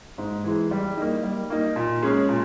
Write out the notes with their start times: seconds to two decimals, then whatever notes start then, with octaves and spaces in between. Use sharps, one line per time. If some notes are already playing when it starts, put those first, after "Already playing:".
0.18 G#2
0.44 E3 G#3
0.71 G3
0.97 A#3 D#4
1.23 G3
1.50 A#3 D#4
1.76 A#2
2.02 G#3 C#4 G#4
2.29 A#2